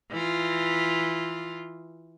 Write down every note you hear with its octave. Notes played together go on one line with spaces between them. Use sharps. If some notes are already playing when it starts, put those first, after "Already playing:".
E3 F4